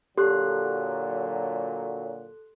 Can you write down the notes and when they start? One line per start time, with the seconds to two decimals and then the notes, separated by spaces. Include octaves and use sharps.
0.18 A#2 D3 F#3 G4 A4 C6 F#6